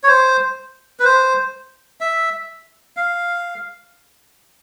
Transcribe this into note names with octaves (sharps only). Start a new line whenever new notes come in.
C#5
C5
B4
C5
E5
F5